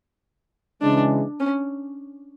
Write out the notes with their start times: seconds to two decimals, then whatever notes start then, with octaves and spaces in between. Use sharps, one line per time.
0.82 C#3 E3 G#3 D4
1.40 C#4